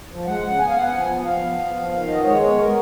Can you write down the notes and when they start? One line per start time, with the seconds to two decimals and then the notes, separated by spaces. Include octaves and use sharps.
0.10 F3
0.26 G#3 F#5
0.43 C#3
0.59 B3 G#5
0.68 F5
0.76 B3 F#5
0.92 F3 G#5
1.09 B3
1.25 F3 F5
1.42 B3
1.58 F3
1.75 F3
1.91 D#3 F5
2.08 B3 D#5
2.24 G#3 C#5
2.41 B3 C#5
2.57 B3 A#4